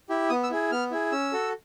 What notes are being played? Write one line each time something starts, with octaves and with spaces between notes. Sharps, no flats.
E4 G4
B3 D#6
E6
E4 G#4
B3 F6
E4 G#4
C#4 E6
F#4 A4